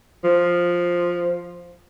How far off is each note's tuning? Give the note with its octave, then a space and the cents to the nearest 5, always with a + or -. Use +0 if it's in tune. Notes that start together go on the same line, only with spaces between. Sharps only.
F3 +5